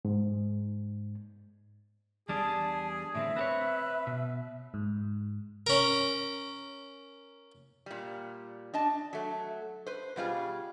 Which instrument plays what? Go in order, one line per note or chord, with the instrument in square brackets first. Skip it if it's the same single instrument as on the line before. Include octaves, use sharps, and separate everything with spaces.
[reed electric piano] G#2
[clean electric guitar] E2 G3 D4 [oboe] G#4 [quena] A5
[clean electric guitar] A2 D3 C4 [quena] E5
[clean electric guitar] C4 G4 C#5 [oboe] B4
[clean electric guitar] B2
[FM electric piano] G#2
[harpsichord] C#4 A#4
[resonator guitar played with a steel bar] A#2 G3
D4 D#5 A5
F#3 A3
B4 C5
B2 G3 F4 G#4